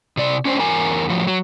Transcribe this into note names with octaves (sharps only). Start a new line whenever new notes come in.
C3 D5
C#4 D4 C5
E2 A#4 G#5
A2 F3 F#3
F#3